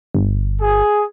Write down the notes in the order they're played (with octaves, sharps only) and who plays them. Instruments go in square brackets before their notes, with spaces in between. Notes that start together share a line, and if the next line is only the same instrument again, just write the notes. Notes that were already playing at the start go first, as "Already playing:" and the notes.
[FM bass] G1
[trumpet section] G#4